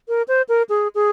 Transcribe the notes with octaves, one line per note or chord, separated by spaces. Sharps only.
A#4
C5
A#4
G#4
G#4